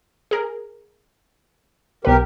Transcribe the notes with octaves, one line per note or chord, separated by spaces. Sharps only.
G#4 A#4
B1 G4 A#4 B4